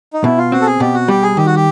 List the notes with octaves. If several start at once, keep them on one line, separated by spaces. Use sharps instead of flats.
D#4
B2 E4
F4
C4 F#4
A4
G#4
B2 G4
F#4
G3 G4
G#4
D#3 G4
F#4
G4